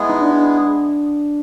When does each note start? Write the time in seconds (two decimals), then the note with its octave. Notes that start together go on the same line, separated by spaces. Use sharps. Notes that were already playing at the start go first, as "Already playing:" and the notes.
Already playing: G#3 B3 E4 G#4
0.10 D#4
0.21 D4